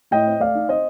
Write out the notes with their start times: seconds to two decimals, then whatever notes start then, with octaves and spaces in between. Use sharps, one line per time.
0.11 A2 D#5 G5
0.27 C4
0.40 A3 D5 F5
0.55 D#4
0.69 C4 C5 D#5